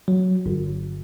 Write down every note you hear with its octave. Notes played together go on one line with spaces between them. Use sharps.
F#3
G1